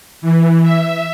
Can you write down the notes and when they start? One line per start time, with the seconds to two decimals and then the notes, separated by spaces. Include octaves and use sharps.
0.22 E3
0.63 E5